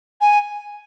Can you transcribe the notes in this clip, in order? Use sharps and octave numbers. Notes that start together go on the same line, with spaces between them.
G#5